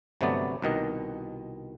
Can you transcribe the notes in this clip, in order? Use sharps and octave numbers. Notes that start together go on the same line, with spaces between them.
G1 C3 F#3 A3 B3 D5
C2 B2 D#3 D#5